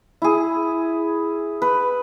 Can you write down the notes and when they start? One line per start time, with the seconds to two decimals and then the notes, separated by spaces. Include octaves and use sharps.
0.22 E4 G#4
1.62 B4